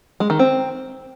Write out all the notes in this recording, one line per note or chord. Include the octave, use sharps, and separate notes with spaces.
G#3
D#3
C4